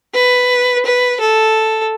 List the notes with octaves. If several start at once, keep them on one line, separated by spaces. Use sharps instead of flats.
B4
B4
A4